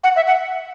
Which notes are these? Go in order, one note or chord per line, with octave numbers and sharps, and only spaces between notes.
F#5
E5
F#5